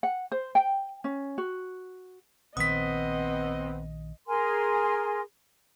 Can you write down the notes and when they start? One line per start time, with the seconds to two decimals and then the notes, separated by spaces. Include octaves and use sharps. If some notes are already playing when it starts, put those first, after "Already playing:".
0.03 F#5
0.32 C5
0.55 G5
1.04 C#4
1.38 F#4
2.57 A#1 D#3 B3 C4 D#5 D#6 B6
4.28 G#4 A#4 G#5 C6